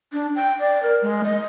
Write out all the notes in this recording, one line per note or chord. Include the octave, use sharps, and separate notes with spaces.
D4
G5
D5
A#4
G#3
D#5